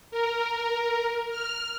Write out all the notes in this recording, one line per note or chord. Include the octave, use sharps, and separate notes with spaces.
A#4
F6